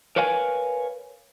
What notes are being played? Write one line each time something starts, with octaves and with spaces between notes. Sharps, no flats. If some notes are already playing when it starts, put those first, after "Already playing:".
A#4 B4 C#5 F5 G#5